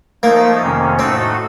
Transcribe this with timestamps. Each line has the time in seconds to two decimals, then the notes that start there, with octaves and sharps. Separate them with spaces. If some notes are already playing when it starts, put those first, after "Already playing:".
0.23 F3 A3 A#3 D#4
0.61 F2 C3 D#3 A#3 C#4
0.99 A2 A3 C4 D#4 F#4 A4